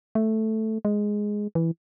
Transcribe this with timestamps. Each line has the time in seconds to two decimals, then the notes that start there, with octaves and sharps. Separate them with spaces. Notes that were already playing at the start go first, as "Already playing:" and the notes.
0.15 A3
0.85 G#3
1.55 E3